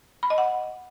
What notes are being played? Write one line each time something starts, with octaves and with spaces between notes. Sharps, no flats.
B5
D#5
F#5